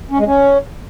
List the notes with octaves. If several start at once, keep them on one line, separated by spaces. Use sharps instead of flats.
C#4
G#3
C#4